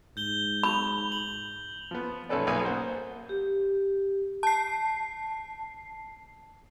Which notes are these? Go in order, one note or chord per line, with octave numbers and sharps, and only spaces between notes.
G#2 G6 G7
B5 F7
F#7
F3 B3
B1 C#4 A4 B4 D5
B1 A#3 B4 G#5 D#6
A#3 C5 F#5
G4
A5 C7